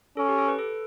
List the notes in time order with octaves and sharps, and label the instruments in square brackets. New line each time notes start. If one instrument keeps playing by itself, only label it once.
[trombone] C#4 [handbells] A4
[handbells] G4
A4
B4
A4